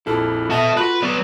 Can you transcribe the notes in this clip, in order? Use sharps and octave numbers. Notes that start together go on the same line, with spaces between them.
A#1 F2 E4 A4
F#4 D#5 E5 F#5 A5
F4 F#4 B4 F#6
F#3 B3 B4 D5